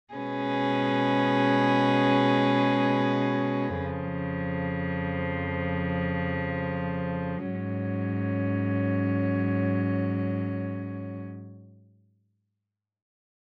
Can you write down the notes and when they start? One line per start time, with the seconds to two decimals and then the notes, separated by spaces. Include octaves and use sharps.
0.12 B2 G#3 C#4 G#4 B4
3.80 F2 C#3 F3
7.49 G#2 F#3 C#4